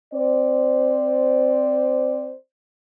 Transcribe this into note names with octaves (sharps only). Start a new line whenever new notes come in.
C4 C5 D5